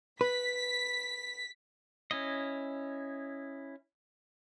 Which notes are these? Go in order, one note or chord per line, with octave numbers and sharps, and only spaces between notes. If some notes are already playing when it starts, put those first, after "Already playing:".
B4 B6
C#4 E4 D#5